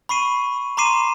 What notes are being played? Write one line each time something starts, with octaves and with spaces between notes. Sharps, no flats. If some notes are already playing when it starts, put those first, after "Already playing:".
B5 C#6 C7 D#7
A#5 C6 D6 C7 D#7 E7